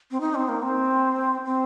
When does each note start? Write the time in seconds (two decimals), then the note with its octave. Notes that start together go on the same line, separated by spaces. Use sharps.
0.11 C4
0.20 D#4
0.35 C4
0.48 A#3
0.62 C4
1.45 C4